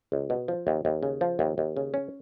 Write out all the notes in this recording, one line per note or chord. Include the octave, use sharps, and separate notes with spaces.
C#2
B2
F3
D#2
D#2
C#3
F3
D#2
D#2
C#3
C#4